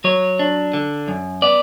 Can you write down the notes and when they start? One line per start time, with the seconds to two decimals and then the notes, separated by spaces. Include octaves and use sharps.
0.04 F#3 C#5
0.39 D4
0.73 D3
1.08 F#2
1.42 B3 D5